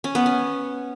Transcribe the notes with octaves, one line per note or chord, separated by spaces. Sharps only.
C#4
B3
C#4